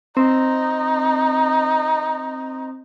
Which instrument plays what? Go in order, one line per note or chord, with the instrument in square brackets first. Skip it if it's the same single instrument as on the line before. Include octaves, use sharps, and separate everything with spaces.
[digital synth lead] C4 [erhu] D#4